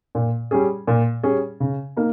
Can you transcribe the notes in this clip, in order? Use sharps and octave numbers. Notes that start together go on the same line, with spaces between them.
A#2
G3 C#4 G#4
A#2
G3 C#4 G#4
C#3
A#3 D#4